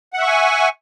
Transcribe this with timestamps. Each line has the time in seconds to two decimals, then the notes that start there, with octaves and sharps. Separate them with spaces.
0.13 F#5
0.18 E5
0.23 C#6
0.28 G#5